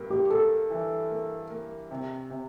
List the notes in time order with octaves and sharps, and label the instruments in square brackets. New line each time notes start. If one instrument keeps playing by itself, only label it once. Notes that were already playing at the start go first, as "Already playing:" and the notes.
Already playing: [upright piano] G2 A#3
[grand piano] G4
[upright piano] A#3 [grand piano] A4
[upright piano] E3
A#3
A#3
C3
C3